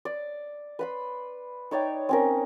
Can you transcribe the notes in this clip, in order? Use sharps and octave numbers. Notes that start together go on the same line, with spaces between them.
D5
B4 B5 C6
D#4 C#5 D5 G5
C4 C#4 A#4